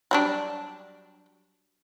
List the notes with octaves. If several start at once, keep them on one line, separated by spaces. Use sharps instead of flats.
F#3 G3 D4